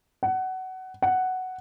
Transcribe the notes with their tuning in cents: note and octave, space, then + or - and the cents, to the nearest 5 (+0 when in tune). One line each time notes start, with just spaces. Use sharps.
F#5 +20
F#5 +5